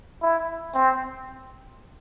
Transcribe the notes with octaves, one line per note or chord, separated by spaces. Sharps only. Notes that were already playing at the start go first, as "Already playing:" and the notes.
E4
C4